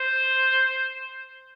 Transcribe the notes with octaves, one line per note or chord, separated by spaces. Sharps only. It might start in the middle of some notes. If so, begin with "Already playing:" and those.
Already playing: C5